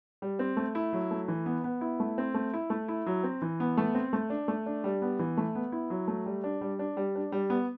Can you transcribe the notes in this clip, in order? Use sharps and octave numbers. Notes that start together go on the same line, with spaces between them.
G3
C4
A3
E4
F#3
A3
E3
B3
B3
E4
A3
C4
A3
E4
A3
E4
F#3
C4
E3
B3
A3
C4
A3
D4
A3
D4
G3
B3
E3
A3
B3
E4
F#3
A3
G3
D4
G3
D4
G3
D4
G3
B3